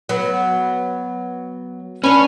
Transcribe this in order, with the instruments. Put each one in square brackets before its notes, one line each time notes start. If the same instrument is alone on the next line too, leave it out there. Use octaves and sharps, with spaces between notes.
[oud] F#3 B3
[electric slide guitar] C#4 [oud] D4 B4